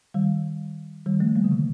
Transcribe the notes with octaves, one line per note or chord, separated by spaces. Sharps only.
D#3 G3
D#3 G3
F3 A3
G3 A#3
D3
C3 D#3